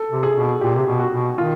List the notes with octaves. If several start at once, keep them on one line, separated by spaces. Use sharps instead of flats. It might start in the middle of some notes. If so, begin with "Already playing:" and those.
Already playing: A4
C3
G#4
B2
A#2 G4
C3
B2
F#4
B2
D#3 F4